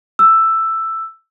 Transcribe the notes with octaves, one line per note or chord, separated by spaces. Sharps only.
E6